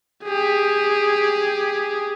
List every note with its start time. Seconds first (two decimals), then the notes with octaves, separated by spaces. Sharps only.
0.24 G4 G#4